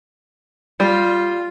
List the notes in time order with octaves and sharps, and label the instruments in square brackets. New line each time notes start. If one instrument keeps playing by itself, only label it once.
[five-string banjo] G3 [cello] F4